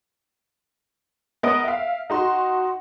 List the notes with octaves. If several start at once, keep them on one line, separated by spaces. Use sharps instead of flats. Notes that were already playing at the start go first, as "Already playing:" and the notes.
B3 A#4 D#5 F#5 D#6 D7
E5 F5
D#4 F#4 C6